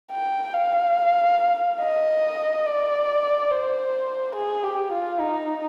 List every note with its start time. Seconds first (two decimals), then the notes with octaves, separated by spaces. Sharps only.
0.12 G5
0.54 F5
1.81 D#5
2.66 D5
3.51 C5
4.35 G#4
4.63 G4
4.92 F4
5.20 D#4